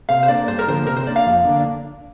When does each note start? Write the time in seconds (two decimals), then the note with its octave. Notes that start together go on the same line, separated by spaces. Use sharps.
0.09 C3 F5
0.23 C5
0.28 A#3 D4 D5
0.48 G2 C5
0.59 A#4
0.67 D3 F3 A#3 C5
0.86 C3 A#4
0.96 C5
1.06 A#3 D4 D5
1.16 F5
1.26 F2
1.44 D3 A#3 D4